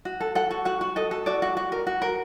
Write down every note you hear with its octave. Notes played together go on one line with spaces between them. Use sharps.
F#4
A4
A4 F#5
F#4
F#4 F#5
F#4
A4 D#5
A4
F#4 D5
F#4
F#4
A#4
F#4
A#4